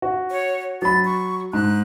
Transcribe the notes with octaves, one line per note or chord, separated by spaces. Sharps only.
F#4
C#5
F#3 B5 A6
C#6
G#2 F#6